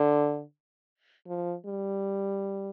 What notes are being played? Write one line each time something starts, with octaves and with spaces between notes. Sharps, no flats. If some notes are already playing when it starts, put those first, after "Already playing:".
Already playing: D3
F3
G3